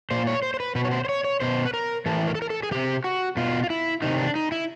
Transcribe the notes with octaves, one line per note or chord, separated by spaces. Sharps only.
A#2 C5
C#5
C5
C5
B4
B2 B4
C#5
C5
C5
C#5
C#5
B2 C5
B4
A#4
A2 E3 A4
A#4
A4
A#4
A4
G#4
C3 E3 G4
F#4
B2 F4
F4
E4
C3 D#3 D#4
D4
D#4
E4